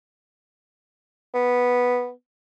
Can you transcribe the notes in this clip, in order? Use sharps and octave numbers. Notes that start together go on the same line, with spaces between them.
B3